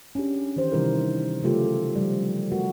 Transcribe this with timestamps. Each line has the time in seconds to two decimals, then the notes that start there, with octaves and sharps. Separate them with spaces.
0.15 C#4 D4 G4
0.56 D#3 E3 G4 C5
0.72 C3 D#3 E3 G3 E4 A#4
1.43 C#3 F#3 A3 F4 G4 A4
1.96 F3 G3
2.52 A3 F#4 A#4